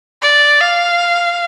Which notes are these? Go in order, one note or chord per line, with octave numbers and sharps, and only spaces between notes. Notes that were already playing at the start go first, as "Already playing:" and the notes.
D5
F5